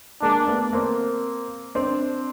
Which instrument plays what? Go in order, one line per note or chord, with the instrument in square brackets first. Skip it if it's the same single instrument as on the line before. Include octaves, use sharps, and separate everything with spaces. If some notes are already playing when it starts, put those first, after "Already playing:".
[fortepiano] G#3 A#3 [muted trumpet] D4
[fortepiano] A3 B3
A#3 C4
C4 D4